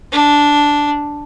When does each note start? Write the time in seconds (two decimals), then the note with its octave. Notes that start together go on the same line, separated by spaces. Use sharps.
0.12 D4